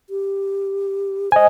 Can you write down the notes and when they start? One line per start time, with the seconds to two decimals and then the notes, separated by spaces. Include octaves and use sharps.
0.10 G4
1.32 C5 D#5 G#5